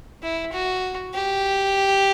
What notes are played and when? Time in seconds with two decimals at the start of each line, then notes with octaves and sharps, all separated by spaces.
0.23 E4
0.53 F#4
1.14 G4